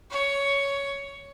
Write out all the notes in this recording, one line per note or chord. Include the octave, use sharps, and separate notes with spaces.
C#5